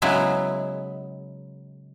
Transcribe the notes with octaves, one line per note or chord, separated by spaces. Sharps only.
C#3 F#3 G#3 B3 E4